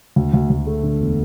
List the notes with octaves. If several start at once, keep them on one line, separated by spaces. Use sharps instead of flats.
D2
D2
D2
A3
D3
E1